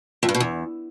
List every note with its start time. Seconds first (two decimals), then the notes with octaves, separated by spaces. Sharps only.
0.23 F2
0.29 G2
0.35 B2
0.40 E2